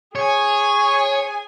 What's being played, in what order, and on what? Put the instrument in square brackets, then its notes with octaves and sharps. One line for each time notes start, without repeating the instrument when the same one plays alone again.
[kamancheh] G#4 G#5 [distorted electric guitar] C#5